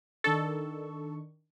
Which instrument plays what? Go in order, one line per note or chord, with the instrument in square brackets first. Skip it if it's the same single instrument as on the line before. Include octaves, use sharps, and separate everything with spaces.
[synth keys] D#3 D4 C#6 [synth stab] A4